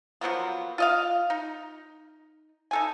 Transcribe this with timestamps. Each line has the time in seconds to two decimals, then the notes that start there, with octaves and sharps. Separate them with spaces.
0.21 F3 F#3 A#3 B3
0.78 F4 D#5 F5
1.30 D#4
2.71 D#4 A4 G#5